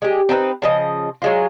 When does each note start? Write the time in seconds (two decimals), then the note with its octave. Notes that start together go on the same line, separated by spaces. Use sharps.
0.02 G#3 G4
0.29 C4 D#4 A4 B4
0.62 C#3 F3 D#5
1.22 F#3 G#3 F4